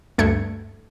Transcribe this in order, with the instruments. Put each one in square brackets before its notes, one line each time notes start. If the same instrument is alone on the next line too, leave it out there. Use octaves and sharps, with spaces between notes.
[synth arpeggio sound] D2 G2 A3 G#6 C#7